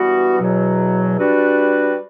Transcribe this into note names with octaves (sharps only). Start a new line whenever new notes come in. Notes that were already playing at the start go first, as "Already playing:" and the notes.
Already playing: G2 E3 G3 B3 F#4
E2 B2 F#3
G3 D4 F#4 B4